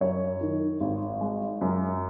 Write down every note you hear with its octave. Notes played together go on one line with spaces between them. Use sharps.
F#2 C#5
D#3
G#1
G#3
F#2